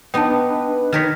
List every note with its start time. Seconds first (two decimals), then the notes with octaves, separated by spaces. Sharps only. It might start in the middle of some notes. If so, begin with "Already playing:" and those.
0.14 B3 D4 D#4 B4 D#5 G5 A5
0.93 D#3 A#4 C#5 F6 B6